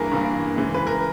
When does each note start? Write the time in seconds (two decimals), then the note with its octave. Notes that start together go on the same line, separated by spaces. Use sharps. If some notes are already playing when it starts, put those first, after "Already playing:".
Already playing: G2 E3 A#3 G#4 A#4
0.12 G2 E3 A#3
0.56 C#3 E3 G#3
0.74 B4
0.87 A#4